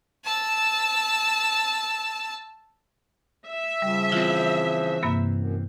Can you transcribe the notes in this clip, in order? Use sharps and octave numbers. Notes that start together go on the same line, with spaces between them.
A5 E6
E5
C#3 F3 G3
E3 C4 F4
G2 C3 A#3
F#2